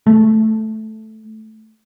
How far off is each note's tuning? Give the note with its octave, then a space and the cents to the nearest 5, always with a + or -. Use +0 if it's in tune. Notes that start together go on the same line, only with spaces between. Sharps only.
A3 -5